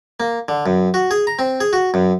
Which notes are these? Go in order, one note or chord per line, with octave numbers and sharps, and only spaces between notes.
A#3
D3
F#2
F#4
G#4
A#5
C4
G#4
F#4
F#2